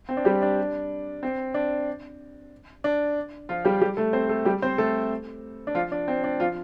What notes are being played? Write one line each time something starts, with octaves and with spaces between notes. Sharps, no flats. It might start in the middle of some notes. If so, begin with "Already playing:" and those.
C4
D4
G3 G4
D4
C4
D4
D4
F3 F4
G3 G4
G3 G4
A3 A4
C4 C5
A3 A4
G3 G4
C4 C5
A3 A4
D4
F3 F4
D4
C4
D4
F3 F4